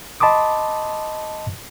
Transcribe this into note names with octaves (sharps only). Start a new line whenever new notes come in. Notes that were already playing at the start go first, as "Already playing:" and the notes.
D#5 A5 B5 C6 D6 D#6